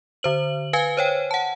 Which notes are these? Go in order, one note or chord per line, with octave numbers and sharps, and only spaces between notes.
D3 C5 F#7
B4 F5 G#5 G#6
C5 C#5 G5
F#5 A5